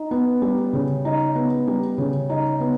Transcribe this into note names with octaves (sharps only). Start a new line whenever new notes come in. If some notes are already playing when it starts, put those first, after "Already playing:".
Already playing: D#4
B3
G3
C#3
D#4
B3
G3
C#3
D#4
B3